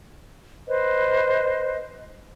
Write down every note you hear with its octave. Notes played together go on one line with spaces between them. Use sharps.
B4 C5 D#5